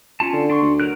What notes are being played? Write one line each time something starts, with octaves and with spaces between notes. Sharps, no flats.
C#4 F4 A5
D3
D4 C6 C#6
D2
F#3 A#4 F#6